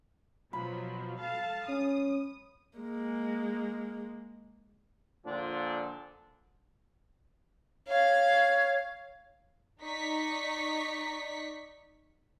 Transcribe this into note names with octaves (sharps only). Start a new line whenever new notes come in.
B2 F3 F#3 B5
A4 F5 A5
C#4 D#6
G#3 A#3
A#2 D3 F3 D4
C#5 F5
D#4 D5 C#6 B6